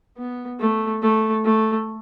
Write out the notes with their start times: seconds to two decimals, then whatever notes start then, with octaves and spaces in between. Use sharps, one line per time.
0.18 B3
0.60 A3
1.02 A3
1.44 A3